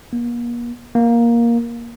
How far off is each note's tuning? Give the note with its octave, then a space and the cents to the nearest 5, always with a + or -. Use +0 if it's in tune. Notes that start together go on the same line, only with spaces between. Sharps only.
A#3 +40
A#3 +10